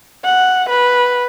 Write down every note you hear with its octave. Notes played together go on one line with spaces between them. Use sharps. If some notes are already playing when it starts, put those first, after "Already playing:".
F#5
B4